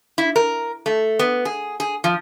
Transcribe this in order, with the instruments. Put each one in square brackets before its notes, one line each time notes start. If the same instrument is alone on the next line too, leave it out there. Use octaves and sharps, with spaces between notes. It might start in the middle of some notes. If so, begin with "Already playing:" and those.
[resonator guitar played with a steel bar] E4
A#4
A3
B3
G#4
G#4
F3